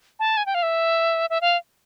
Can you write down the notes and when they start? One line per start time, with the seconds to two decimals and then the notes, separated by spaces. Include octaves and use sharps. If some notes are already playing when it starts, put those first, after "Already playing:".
0.20 A5
0.37 G#5
0.46 G5
0.55 F5
0.63 E5
1.30 E5
1.41 F5